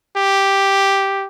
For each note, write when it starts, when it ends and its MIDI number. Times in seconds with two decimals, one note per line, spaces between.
0.17 1.27 67